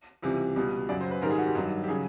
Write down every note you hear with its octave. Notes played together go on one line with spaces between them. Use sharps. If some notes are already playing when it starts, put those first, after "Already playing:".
C#2 C3 E3 G3
C#2 B2 G3
F#2 C#3 F#3 D5
C5
B4
G#2 D#3 G3 A#4
G#4
F#4
G4
G2 D#3 F#3
G4
C#3 F#3 G#4